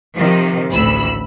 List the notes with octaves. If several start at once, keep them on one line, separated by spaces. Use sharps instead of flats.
C3 D#3 F3
A1 D2 D3 B5 E6